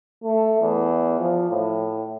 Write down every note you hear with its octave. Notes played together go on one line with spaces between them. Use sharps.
A3
E2
F3
A2